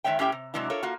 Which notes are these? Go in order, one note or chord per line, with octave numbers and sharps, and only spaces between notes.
E2 D#3 G#3 C#5 E5 G5
A2 C#4 G4 E5 G5
C3
C3 F#3 G#3 D4 E4
F4 A4 A#4 C#5
A#3 F4 F#4